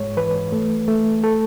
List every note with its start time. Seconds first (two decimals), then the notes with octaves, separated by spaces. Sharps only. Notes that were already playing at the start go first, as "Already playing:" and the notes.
Already playing: G#2 G#3 C#5
0.17 E3 B4
0.52 A3
0.88 A3
1.24 A4